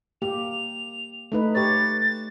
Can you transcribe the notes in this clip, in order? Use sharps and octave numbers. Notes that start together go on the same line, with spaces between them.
A#3 G4 F7
A3 D#4 B4
G4 B4 C#5 A6
A6